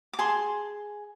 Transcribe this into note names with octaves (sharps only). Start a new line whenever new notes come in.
D6
G#4 A5 C6